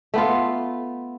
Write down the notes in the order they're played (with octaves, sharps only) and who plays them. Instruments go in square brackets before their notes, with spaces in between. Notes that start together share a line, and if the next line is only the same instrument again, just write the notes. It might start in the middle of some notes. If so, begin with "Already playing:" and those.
[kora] A3 B3 F4